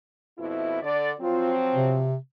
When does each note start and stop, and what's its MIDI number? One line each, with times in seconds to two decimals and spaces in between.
0.38 0.80 41
0.38 0.80 47
0.38 0.80 64
0.82 1.11 50
0.82 1.11 74
1.20 2.09 53
1.20 2.09 54
1.20 2.09 60
1.20 1.54 65
1.75 2.17 48